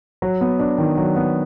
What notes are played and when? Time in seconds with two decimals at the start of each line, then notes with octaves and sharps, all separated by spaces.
0.22 F#3
0.41 B3
0.59 D4
0.78 D#3
0.97 F#3
1.16 B3